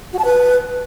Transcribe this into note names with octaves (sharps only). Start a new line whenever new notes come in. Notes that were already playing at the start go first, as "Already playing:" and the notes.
F#4
A5
B4